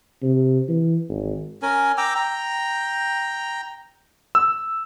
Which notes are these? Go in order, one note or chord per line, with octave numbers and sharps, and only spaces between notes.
C3
E3
G#1
C#4 A#4 G#5
G5 A#5 D6 E6
G5 A#5
E6